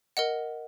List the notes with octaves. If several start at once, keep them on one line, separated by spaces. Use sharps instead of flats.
A#4 D#5 F#5